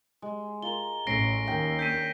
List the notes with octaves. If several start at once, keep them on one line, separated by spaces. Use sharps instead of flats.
G#3
F4 A#4 G7
A1 C#4 A#6 C7 D7
D#2 E5 G5
D4 G6 B6 D#7